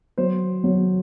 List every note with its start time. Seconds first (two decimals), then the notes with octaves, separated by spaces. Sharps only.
0.18 F#3 C5
0.64 F#3